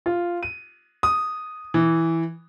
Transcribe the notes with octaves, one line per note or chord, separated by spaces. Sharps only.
F4
D#7
D#6
E3